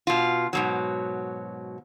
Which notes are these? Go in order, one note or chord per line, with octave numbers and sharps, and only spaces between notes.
B2 F4
G#2 B2 F#3